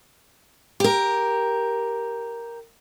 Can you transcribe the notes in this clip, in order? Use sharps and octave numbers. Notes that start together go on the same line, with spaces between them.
G4 A#4